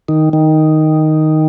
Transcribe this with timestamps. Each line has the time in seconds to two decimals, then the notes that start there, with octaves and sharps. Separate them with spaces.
0.09 D#3
0.33 D#3